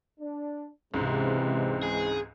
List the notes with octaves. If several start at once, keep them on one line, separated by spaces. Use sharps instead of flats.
D4
C#2 G#2 C3 E3 G#3 C4
G#4